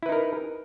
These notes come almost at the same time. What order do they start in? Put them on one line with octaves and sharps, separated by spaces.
E4 B4 D#4 A#4